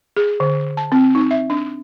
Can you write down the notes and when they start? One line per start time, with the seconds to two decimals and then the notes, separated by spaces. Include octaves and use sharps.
0.17 G#4
0.40 D3
0.77 A5
0.92 C4
1.15 D#4
1.31 E5
1.50 D4